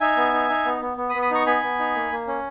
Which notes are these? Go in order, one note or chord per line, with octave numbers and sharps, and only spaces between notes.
D#4 E5 G#5
B3
D#4
D#4
B3
B3
B3
B5 D#6
B3
B5 D#6
D#4 A#5 C#6
B3 G#5 B5
B3
D#4
A#3
A#3
C#4